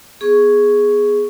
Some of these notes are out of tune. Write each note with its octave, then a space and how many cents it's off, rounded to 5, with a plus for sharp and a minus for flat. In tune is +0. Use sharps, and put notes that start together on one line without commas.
B3 -15 G#4 +0 C#6 +0